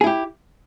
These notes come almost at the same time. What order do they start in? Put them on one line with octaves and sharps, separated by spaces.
G#4 E4 G4